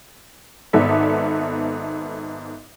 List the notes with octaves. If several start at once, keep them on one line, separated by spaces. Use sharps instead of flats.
G#1 G#2 B3 A4 D5 E5